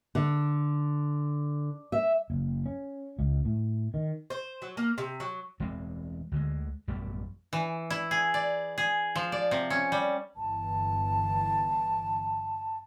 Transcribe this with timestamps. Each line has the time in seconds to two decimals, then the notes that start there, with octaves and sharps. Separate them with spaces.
0.15 D3
1.92 E5
2.30 F#1
2.66 C#4
3.19 C#2
3.45 A2
3.94 D#3
4.30 C5
4.62 F#3
4.77 A#3
4.98 C3
5.20 F#3
5.60 E1 E3 G#3 C4
6.32 D2 D3 G#3
6.88 A1 F#2 B2 G3
7.53 E3
7.90 E4
8.11 G#4
8.34 D5
8.78 G#4
9.15 F3
9.32 D5
9.51 C3
9.70 C#4
9.92 G3
10.36 G1 E3 A5